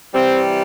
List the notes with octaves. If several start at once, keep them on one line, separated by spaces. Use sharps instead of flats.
C3 E3 G3 C4